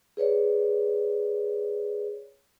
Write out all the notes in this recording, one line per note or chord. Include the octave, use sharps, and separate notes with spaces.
G#4 B4 C#5 D5